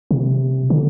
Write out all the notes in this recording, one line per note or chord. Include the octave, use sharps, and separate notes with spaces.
C3
D3